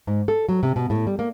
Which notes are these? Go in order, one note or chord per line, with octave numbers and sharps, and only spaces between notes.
G#2
A4
F#3
C3
B2
A2
G3
A#3